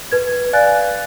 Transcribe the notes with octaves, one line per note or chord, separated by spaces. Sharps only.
B4 G#6
D5 F5 G#5 F#6 A6